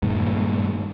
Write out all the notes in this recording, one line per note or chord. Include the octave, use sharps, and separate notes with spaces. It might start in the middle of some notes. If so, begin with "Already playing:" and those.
G2 A#2 D#3 G#3